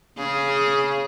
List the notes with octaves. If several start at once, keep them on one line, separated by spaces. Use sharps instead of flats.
C#3 G#4